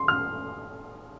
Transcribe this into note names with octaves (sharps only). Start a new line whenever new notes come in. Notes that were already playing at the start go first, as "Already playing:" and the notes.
Already playing: C6
F6